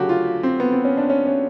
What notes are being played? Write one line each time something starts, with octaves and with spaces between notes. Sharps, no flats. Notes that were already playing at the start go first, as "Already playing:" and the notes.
Already playing: D2 C#3 F#3 A3 F#4 G4
F4
C4
B3
C4
C#4
D4
C#4
C#4